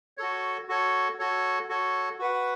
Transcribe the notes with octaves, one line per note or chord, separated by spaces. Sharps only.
F#4 A4 C#5
F#4 A4 C#5
F#4 A4 C#5
F#4 A4 C#5
F#4 B4 F#5